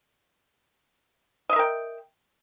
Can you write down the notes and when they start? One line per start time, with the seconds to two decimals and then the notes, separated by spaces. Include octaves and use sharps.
1.49 D#5
1.53 E5
1.56 A#4
1.59 G5